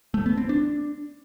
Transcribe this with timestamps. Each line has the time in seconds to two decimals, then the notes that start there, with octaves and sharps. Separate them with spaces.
0.14 A3
0.26 B3
0.38 C4
0.49 D4